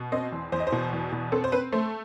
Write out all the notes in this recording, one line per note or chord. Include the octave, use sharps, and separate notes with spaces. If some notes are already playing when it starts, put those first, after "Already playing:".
Already playing: B2
C4 D#5
E2
E2 C5
D#5
C5
B2
E2
B2
C4 A4
C5
C4 B4
A3 C5